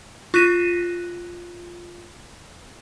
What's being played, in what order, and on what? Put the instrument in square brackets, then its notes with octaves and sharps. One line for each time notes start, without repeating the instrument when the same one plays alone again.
[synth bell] F4 F#6 A#6 B6 D#7 E7